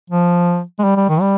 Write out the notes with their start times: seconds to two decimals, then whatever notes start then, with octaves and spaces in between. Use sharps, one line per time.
0.10 F3
0.79 G#3
0.84 G3
0.96 G3
1.09 D#3
1.21 G3